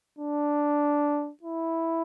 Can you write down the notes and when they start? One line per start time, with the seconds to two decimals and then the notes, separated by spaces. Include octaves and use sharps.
0.19 D4
1.43 E4